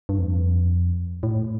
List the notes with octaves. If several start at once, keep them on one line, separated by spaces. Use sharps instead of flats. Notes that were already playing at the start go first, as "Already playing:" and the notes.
G2
F2
A2